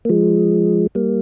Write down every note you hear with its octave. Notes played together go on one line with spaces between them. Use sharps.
A#3
F3 G#3
G3 A#3